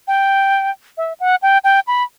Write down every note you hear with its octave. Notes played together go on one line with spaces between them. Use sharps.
G5
E5
F#5
G5
G5
B5